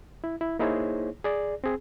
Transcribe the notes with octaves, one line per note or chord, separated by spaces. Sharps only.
E4
E4
A#3 D#4 E4 G#4 C5 C#5
G#4 D5
C4 G#4